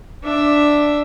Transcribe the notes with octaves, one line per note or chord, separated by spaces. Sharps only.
D4 E5